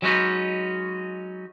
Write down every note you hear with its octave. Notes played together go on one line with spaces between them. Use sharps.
F#3 G#3 C#4 D#4 F#4 B4